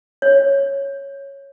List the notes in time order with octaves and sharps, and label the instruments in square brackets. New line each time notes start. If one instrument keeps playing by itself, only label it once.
[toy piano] C#5